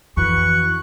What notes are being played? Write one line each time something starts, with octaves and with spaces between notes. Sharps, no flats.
F2 E3 F#4 B4 C#6 F#6